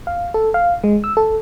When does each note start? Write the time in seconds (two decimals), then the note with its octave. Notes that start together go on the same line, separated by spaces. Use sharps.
0.07 F5
0.34 A4
0.54 F5
0.84 G#3
1.04 E6
1.17 A4